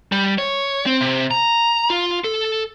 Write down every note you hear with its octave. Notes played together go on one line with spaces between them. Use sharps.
G3
C#5
C4
C3
A#5
F4
A4